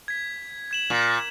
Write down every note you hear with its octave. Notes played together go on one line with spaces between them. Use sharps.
G#6 B6
G#6 E7 F#7
A#2